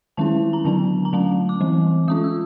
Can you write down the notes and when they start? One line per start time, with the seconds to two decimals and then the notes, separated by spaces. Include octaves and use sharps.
0.17 D#3 G#3 C#4 E4 A5
0.53 A#5
0.65 D3 F#3 B3 D4 A5
1.05 A#5
1.13 D3 F#3 A3 C#4 A5
1.49 D6
1.60 E3 G3 C4
2.08 G#3 C#4 F4 D#6
2.24 E6